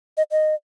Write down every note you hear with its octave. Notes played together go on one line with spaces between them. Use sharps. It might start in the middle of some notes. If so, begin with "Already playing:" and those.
D#5
D#5